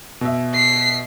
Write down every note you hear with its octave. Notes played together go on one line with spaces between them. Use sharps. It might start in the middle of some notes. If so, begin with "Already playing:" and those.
B2 E5
B6 C7